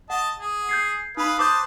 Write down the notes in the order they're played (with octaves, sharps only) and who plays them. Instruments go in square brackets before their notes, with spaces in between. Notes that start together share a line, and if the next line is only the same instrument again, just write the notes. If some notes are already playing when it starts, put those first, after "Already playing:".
[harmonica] D#5 A5 [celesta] F#5
[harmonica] G#4
[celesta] G6 G#6 C7
[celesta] D#4 B5 [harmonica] B4 F5 D#6
[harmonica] B4 C5 A5 [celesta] D6 D#6 G6